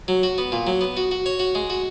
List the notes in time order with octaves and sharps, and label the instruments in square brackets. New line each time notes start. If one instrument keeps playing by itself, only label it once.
[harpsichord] F#3
F#4
B3
A#2
F#3
B3
F#4
F#4
C#5
F#4
G#3
F#4